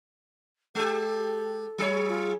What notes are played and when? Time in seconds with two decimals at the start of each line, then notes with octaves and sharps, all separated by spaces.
0.75 G#3 G4 A4
1.78 F#3 G#4 C#5
2.09 F4